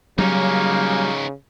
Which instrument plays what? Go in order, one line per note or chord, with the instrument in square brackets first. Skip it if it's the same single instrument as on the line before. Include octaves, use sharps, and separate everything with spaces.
[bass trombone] C#3 [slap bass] F#3 G3 [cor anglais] A#3 [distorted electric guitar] C#4 D#4